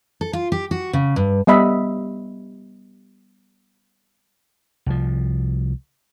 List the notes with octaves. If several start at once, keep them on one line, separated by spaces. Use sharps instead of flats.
A4
F4
G4
F#4
C#3
G2
G3 B3 D#5 E5 B5
C2 F3